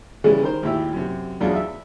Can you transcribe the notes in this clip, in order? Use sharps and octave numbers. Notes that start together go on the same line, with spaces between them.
C#3 E3 G3 G#3
D#3 A#4 C5
G#1 D#2 A#2 E4 G4 E5
F#2 C3
B1 E2 F#3 D4 F4 G#4
E5